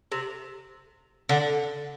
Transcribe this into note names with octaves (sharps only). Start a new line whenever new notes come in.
C3
D3